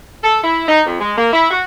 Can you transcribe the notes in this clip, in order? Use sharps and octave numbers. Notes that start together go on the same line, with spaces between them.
A4
E4
D#4
F2
G#3
A#3
E4
F#4